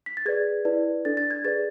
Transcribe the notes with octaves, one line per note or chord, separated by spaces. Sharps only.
B6
A6
G#4 B4 D5 G#6
E4 B4 D5
D4 A4 D5 A6
A6
G#6
G#4 B4 D5 A6